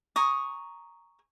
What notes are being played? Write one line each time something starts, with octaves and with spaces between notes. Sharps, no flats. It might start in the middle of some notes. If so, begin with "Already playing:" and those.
G#5 A#5 C#6 D#6